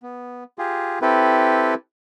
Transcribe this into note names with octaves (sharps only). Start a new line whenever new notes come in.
B3
F4 G4 G#4
C4 E4 G4 A4 B4